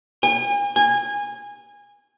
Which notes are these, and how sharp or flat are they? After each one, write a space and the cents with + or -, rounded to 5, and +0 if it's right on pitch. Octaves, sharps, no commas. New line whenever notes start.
G#5 -40
G#5 -20